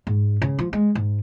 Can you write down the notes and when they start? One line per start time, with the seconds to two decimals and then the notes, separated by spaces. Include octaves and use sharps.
0.07 G#2
0.42 C#3
0.59 F3
0.73 G#3
0.95 G#2